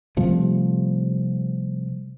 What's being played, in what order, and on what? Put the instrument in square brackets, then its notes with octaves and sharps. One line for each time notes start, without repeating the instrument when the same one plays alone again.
[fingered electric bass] C3 F3 G3 A3